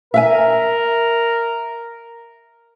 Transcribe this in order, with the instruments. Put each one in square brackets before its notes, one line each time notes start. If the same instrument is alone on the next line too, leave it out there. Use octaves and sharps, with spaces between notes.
[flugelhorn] A#4 [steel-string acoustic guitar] E5 F5 G#5